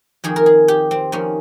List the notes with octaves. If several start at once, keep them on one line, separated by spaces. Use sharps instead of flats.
F2 D#3 A#3 G#4
A#4
G#4
G4
C4
F2 D#3 A#3 C#4